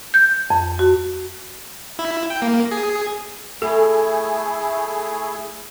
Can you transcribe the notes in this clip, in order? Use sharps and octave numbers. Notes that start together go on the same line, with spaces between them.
G6
F2
F#4
E4
G5
A#3
G#4
A3 E4 G#4 A4